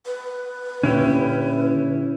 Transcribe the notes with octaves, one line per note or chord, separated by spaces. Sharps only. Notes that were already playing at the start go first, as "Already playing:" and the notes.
B4
A#2 D3 C#4 E4 G4